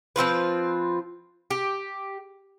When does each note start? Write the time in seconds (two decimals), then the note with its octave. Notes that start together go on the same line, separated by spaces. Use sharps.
0.16 F3 C4 F4 B4
1.51 G4